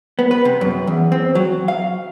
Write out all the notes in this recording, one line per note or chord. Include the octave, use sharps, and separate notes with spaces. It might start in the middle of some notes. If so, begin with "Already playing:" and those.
B3
B4
C3
F#2
E2
C4
F#3
F5